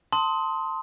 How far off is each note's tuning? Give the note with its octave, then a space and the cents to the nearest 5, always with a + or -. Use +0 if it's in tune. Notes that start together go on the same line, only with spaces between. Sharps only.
A5 +25 C6 +0 D#6 +25